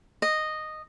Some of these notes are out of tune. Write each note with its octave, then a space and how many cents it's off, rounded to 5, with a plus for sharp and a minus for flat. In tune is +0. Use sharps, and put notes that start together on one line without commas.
D#5 -10